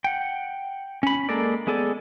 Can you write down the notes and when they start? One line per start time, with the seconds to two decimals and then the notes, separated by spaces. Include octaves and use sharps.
0.04 F#5 G5
1.03 C#4 B5
1.29 G#3 A#3 A4 A#4 D5
1.67 G#3 B3 G#4 A4 D5